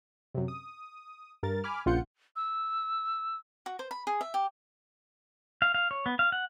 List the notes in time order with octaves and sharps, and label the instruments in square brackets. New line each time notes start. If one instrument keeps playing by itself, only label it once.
[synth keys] F#2 C3
D#6
G2 A#4 A6
G#5 B5 D6 F6
A#1 C#3 F4 F#5 G6 C#7
[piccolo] E6
[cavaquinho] F#4
C5
B5
G#4
E5
G4
[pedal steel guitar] F5
F5
C#5
B3
F5
F#5